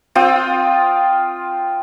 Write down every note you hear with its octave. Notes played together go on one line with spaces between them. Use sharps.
C4 F4 G5 D#6